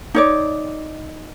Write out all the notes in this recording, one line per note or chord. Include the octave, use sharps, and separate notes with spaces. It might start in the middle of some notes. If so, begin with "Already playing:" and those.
D#4 C#5 D5